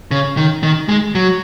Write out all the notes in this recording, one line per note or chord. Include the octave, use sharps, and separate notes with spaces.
C#3
D#3
D#3
G#3
F#3